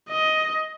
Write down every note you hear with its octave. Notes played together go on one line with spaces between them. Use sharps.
D#5